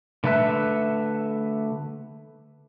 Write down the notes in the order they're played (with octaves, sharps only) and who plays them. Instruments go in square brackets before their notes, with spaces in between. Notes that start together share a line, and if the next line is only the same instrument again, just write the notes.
[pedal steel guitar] D3 A3 B4 E5 F#6